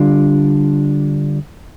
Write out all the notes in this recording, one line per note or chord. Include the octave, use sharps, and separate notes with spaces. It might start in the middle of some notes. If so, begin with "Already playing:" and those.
Already playing: D3 G3 D4 F4